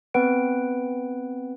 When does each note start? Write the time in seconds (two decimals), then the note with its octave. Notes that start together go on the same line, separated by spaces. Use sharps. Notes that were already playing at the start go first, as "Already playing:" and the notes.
0.14 B3 C4 B4 F#5 D7